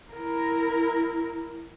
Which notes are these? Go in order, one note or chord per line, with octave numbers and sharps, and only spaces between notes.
E4 A#4